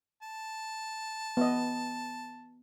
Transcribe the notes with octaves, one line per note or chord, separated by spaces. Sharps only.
A5
B3 D#5